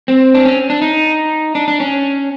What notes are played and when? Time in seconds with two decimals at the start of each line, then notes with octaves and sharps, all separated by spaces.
0.08 C4
0.34 D4
0.45 C#4
0.70 D4
0.82 D#4
1.55 D4
1.68 D4
1.80 C#4